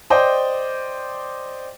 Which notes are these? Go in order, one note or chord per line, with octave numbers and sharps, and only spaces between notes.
C5 D5 D#5 G5